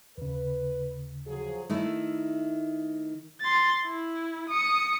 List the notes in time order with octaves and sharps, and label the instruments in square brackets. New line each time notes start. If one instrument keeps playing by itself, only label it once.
[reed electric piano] D#2 C#3 [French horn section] B4
[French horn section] F3 F#3 G#4
[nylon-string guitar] D#3 A3 E4
[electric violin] C6 A6
E4
D#6 C#7